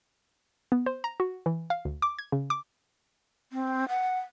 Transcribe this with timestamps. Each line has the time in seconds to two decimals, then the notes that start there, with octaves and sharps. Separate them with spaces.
0.72 B3
0.86 C5
1.04 A#5
1.20 F#4
1.46 E3
1.70 F5
1.85 D2
2.02 D6
2.19 G#6
2.32 C#3
2.50 D6
3.52 C4
3.88 F#5